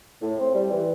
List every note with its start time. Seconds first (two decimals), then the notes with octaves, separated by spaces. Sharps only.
0.22 A2
0.38 C4
0.55 G3
0.71 E3